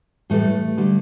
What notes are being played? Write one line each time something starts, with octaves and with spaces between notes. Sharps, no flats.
A2 E3 G3 A3
D3 G3